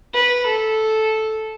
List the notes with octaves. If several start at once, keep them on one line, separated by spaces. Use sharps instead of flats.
B4
A4